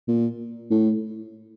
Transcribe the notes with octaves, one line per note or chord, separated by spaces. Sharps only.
A#2
A2